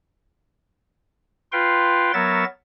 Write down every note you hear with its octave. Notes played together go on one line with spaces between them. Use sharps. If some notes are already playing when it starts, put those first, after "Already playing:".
F4 B4 F5 G5 C6
F#3 B3 A#4 C#5 E5 A6